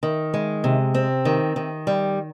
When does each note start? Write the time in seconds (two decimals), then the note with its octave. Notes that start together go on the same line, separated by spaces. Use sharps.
0.03 D#3
0.34 G#3
0.64 C3
0.94 C4
1.25 D#3
1.56 D#3
1.87 G3